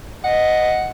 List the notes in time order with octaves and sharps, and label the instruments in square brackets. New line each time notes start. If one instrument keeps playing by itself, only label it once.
[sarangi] D#5 [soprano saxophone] F#5